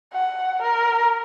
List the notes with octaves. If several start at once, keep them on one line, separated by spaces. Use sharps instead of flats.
F#5
A#4